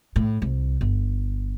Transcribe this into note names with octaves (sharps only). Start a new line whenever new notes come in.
A2
C2
G1